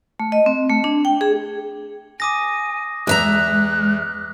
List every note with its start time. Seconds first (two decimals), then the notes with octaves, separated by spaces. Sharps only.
0.20 A3
0.32 D#5
0.46 C4
0.70 A3
0.84 D4
1.05 G5
1.21 G#4
2.20 G#5 D6 D#6 A#6
3.07 E2 G#3 E5 A#5 F#6